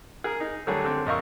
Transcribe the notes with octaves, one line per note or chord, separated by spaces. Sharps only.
G#4 A#4
D#4
D3 F#3 G3 A3 G#4 C#5
D3 C4
A#1 A#4 D#5 F5 C#6 E6